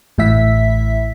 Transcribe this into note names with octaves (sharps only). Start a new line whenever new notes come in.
A1 A2 E4 E5 B6